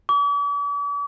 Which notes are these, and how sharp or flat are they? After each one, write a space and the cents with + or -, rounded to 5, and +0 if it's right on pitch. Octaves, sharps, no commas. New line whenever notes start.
D6 -45